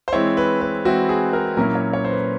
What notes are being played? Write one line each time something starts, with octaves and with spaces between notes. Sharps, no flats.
C5
E3 G#3 C4 E4 C#5
B4
B4
E3 G#3 C4 E4 F#4
G#4
A#4
A#2 F#3 A#3 C#4 E4 A#4
C#5
C#5
C5
B4